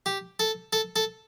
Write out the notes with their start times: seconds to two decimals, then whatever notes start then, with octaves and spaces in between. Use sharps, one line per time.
0.06 G4
0.39 A4
0.73 A4
0.96 A4